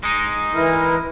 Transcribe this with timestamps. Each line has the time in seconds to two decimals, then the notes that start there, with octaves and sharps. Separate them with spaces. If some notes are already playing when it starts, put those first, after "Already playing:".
0.03 G#3 D#4
0.55 E3 E4 A#4